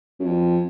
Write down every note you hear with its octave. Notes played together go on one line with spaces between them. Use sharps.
F#2
F2